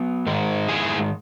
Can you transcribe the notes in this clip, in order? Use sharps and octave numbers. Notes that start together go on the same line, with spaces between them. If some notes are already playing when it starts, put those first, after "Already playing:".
Already playing: F#3 B3
G#2 D#3 G#3
E4 G#4